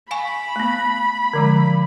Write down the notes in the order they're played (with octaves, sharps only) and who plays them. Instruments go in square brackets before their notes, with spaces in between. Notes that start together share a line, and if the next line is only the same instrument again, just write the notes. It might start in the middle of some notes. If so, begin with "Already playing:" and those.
[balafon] F5 G#5 C#6 [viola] B5
[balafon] A3 B3
D3 F3 G#3